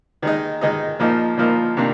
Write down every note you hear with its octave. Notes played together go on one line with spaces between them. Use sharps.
D#3 G#3 D#4
D#3 G#3 D#4
A#2 F3 A#3 D#4
A#2 F3 A#3 D#4
C3 D#3 A#3 D4